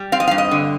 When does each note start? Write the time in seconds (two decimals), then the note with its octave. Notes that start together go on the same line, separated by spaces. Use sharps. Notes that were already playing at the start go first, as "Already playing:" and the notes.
Already playing: G3
0.12 C4 F5
0.20 D#5
0.27 F5
0.31 G2
0.38 D#5
0.51 D3